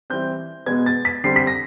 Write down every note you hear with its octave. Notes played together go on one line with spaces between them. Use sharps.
E3 G3 C4 G6
B2 G#3 B3 G#6
A6
B6
D3 G3 C4 C7
B6
A#6